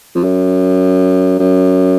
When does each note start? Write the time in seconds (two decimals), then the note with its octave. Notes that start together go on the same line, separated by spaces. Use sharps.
0.15 F2
0.24 F#2
1.39 F#2